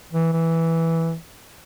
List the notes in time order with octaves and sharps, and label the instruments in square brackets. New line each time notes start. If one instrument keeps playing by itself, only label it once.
[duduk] E3
E3